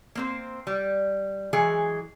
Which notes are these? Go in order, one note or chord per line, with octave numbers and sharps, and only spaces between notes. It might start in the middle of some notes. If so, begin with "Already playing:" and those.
A#3 C4 C5
G3
E3 F#3 G#3 G#4